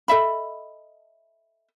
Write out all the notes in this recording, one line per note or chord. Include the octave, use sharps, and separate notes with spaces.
A4 D#5 E5 B5